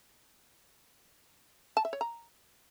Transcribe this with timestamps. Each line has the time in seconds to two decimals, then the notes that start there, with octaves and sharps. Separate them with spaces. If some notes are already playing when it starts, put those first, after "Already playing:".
1.77 A5
1.85 E5
1.93 C#5
2.01 A#5